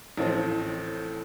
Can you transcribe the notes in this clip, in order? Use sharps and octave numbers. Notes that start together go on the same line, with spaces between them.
A1 A2 F3 C4